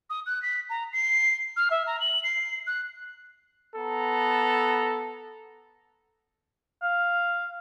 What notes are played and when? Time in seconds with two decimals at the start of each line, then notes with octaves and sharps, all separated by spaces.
0.10 D#6
0.26 F#6
0.42 B6
0.70 A#5
0.92 C7
1.56 F6
1.70 E5
1.86 A#5
2.00 F#7
2.24 C7
2.67 F#6
3.76 B3 A4 A#5
6.82 F5